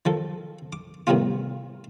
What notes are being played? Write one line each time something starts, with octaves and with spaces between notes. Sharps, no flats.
D#3 F3 A4
D6
A2 C3 D#3 G3 B3 F4